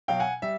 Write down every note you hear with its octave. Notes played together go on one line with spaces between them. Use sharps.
B2 F#3 F5 G5
F#5 G#5
G3 E5